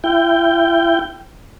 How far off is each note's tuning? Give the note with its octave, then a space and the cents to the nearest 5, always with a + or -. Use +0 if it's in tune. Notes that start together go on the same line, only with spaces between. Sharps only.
E4 +35 G5 +0